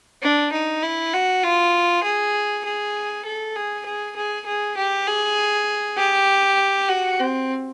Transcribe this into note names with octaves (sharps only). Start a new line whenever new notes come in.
D4
D#4
E4
F#4
F4
G#4
G#4
A4
G#4
G#4
G#4
G#4
G4
G#4
G4
F#4
C4